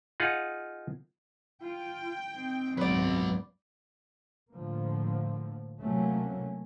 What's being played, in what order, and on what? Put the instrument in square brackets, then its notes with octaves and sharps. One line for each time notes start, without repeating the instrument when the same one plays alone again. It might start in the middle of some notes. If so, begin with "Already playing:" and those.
[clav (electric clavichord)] D#4 F4 G#4 F5 F#5
[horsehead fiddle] F4 [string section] G5
[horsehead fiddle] C4 D#4
[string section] G#1 C#2 F#2 [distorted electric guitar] F#3 B3 [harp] B4 D5
[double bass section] A2 D3 F3 A#3
C3 E3 F#3 A3 A#3 C#4